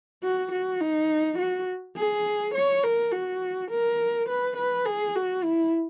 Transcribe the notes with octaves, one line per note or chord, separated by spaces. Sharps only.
F#4
F#4
D#4
F#4
G#4
C#5
A#4
F#4
A#4
B4
B4
G#4
F#4
E4